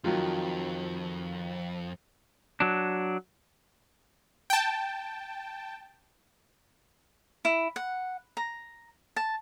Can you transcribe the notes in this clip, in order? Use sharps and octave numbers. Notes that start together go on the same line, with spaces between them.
F2 D#3 F#3 F4
F#3 D4
G5 A5
E4
F#5
A#5
A5